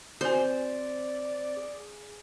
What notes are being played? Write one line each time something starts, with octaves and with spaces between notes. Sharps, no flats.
C4 F#4 C5 D5 G#5
G#4